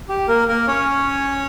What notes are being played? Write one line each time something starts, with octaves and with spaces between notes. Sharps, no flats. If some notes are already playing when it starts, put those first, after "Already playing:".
G4
A#3 A#4
A#3 A#4
C#4 C#5